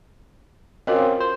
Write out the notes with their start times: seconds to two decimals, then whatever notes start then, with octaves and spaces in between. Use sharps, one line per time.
0.87 C4 C#4 F4 F#4 A#4 D#5
1.20 C5